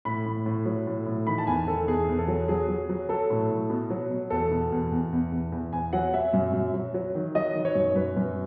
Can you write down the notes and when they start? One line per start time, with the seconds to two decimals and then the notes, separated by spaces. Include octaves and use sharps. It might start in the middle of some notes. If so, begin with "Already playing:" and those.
0.05 A2 B5
0.26 A2
0.46 A2
0.66 F#3
0.87 A2
1.06 A2
1.27 D#3 B5
1.38 A5
1.47 E2 G#5
1.67 D#3 A4
1.88 E2 G#4
2.09 E2
2.18 A4
2.28 F#3
2.48 F#3 G#4
2.68 F#3
2.89 F#3
3.09 F#3 A4
3.30 A2
3.50 A2
3.70 B2
3.90 F#3
4.10 B2
4.30 E2 A4
4.51 B2
4.72 E2
4.92 E2
5.12 E2
5.32 E2
5.52 E2
5.73 E2 G#5
5.93 F#3 F#5
6.14 F#3 E5
6.33 F#2
6.53 F#2
6.74 F#3
6.94 F#3
7.15 D#3
7.35 F#3 D#5
7.55 D#3
7.65 C#5
7.75 F#2
7.96 F#2 B4
8.16 F#2